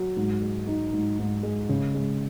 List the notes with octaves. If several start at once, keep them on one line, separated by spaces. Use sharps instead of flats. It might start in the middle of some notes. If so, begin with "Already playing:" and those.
Already playing: F#3
G#2
G#3
D#4
G#2
G#2
G#3
C#3
G#3